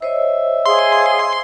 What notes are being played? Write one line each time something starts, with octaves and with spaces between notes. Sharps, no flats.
C5 C#5 D#5 E5
G#4 F5 C6